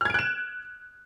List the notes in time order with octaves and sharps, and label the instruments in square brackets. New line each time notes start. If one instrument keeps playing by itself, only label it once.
[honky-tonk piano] F6
G#6
D7
F#6
E7